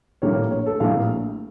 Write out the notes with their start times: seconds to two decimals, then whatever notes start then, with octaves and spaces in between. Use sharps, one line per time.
0.22 A#1 A2 G3 A#3 C#5
0.51 C#5
0.66 A4
0.80 A#1 A2 G3 A#3 F5